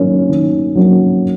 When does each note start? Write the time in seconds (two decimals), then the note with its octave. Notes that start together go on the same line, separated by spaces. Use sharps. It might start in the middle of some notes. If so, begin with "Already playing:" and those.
Already playing: D#3 F#3 A#3 C#4
0.29 D#3
0.75 F#3 A#3 C#4